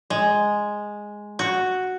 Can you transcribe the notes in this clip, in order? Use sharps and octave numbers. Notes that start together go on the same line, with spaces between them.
G#3
F#4